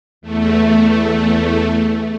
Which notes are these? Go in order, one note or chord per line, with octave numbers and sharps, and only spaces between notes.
E2 A3